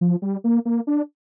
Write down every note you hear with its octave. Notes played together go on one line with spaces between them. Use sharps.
F3
G3
A#3
A#3
D4